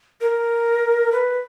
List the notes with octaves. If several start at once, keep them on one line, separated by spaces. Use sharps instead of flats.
A#4
B4